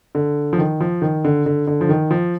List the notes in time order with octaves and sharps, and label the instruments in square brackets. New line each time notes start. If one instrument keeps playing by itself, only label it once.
[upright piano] D3
F3
D#3
F3
D#3
D3
D3
D3
F3
D#3
F3